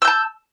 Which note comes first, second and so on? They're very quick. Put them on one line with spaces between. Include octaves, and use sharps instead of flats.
E6 G6 A5